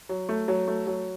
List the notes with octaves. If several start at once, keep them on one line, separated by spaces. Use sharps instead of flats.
F#3
A3
F#3
A3
F#3